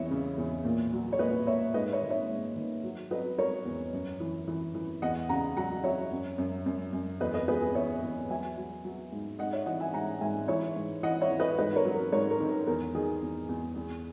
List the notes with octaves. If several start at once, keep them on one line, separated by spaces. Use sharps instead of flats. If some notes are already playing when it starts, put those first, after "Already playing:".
Already playing: E2 E3 C#5 D#5 E5
C#3
E2
A#2
F#3
C#5
A#2 B4 D#5
A#2 C#5 E5
G#2 B4 D#5
C#5 E5
D#3
C#5 E5
G#2
D#3
F#3
F#3 B4 D#5
F#3 A#4 C#5
E2
F#2
E3
E3
E3
E2 D#5 F#5
C#3 F#5 A#5
F#3 F#5 A#5
F#3 C#5 E5
F#2
F#2
F#2
F#2
E2 B4 D#5
B4 D#5
E2 G#4 B4
G#4
E2 C#5 E5
E2
F#3 E5 G#5
F#3
F#3
G#2
G#2 D#5 F#5
C#5 E5
E3 D#5 F#5
E5 G#5
G#2 F#5 A#5
G#2 E5 G#5
E3 C#5 E5
G#2
E3 D#5 F#5
C#5 E5
E3
B4 D#5
G#2 B4 D#5
A#4 C#5
F#3
A#4
G#2 A#4 C#5
A#4
D#3
A#4
E2 A#4
D#3 G#4
E2
E2
E2